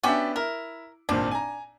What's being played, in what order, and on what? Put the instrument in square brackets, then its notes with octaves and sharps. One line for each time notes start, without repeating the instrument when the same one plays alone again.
[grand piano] B3 D4 E5 [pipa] C#4 F#4 G4
[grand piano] E4 [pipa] A#4
[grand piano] G#1 A#2 C4 [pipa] D4
[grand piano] G#5 A#5